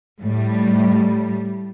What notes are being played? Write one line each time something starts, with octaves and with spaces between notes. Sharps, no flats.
A2 G3